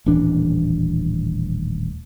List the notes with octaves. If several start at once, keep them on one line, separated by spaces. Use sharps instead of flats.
D#1 A1 E3 D4